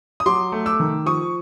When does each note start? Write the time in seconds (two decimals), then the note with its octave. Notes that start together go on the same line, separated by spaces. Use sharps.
0.20 D#6
0.26 F#3 C6 D6
0.52 A3
0.66 D6 E6
0.80 D#3
1.06 F3 C#6 D#6